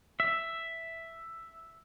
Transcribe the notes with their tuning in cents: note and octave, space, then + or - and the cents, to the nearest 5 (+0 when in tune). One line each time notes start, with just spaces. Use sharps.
E5 +5